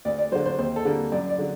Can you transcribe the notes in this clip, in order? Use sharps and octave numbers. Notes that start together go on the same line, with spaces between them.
D2 D5
D5
D3 F#3 C5
C5
D#2 C5
A4
D3 G3 A#3
F#2 D5
D5
D3 F#3